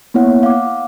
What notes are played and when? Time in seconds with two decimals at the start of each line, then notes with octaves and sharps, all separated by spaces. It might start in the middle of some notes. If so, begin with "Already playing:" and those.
0.14 A#3 B3 E4 C#5 F#5
0.43 F5 F#5 D6